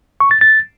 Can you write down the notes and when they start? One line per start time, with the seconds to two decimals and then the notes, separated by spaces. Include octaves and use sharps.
0.20 C#6
0.31 A6
0.41 A6